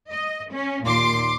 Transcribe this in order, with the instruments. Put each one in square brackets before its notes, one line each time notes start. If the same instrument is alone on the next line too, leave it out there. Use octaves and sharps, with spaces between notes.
[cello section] D#5
C#4
[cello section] D#2 A#2 [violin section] C6 D6